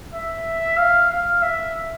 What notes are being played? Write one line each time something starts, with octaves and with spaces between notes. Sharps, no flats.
E5
F5
F5
E5